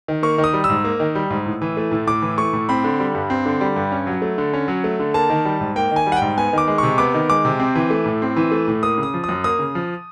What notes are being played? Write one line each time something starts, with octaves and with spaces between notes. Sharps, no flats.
D#3
A#3 C#6
D#3
D#6
G3
E6
G#2
A#3
D#3
G3
G#2
A2
E3
A3
A2
A2 D6
E3
A3 C#6
A2
C4 B5
D3
G3
G2
C4
D3
G3
G2
C#4
F#3
A3
D3
C#4
F#3
A3
D3
A#3 A5
D#3
G3
G#2
A#3 G5
D#3
G#5
G3
F#5
G5
G#2
B3 G#5
D#3 D6
G#3
C3 C#6
B3 D6
D#3
G#3 D6
C3
C4
E3
A3
A2
C4
E3
A3
A2
A#3 D#6
C#3
D#6
F3
F#2 D#6
A#3 D#6
C#3
F3